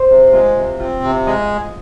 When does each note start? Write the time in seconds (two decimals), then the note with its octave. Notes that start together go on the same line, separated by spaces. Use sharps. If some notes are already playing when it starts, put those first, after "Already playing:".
Already playing: C5
0.10 C3
0.33 G#3 F4
0.56 C3
0.80 C4 F4
1.03 C3
1.27 G#3 D#5